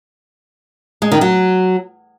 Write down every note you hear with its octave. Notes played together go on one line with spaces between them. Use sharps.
G#3
D#3
F#3